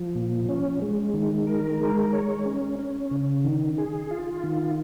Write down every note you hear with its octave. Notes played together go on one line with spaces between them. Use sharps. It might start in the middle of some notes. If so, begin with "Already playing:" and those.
Already playing: F3
A#2
C#4
G#3
D#3
A#4
G#3
C#5
C#4
C#4
C#3
D#3
G#4
F4
D#3